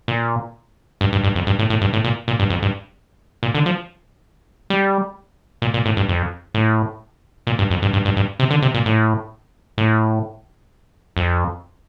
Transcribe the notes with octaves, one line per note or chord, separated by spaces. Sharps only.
A#2
G2
G2
G2
F2
G2
A2
A2
G2
A2
A#2
A#2
G2
F2
G2
A#2
D3
F3
G3
A#2
A#2
A2
G2
F2
A2
A#2
G2
F2
G2
G2
G2
G2
C3
D3
C3
A#2
A2
A2
F2